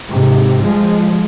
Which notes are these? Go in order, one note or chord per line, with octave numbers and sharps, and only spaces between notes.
G#2 C3
F3 G#3